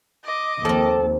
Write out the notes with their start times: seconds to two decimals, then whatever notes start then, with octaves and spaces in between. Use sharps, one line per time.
0.24 D#5 D6
0.65 D#2 F3 C4 A4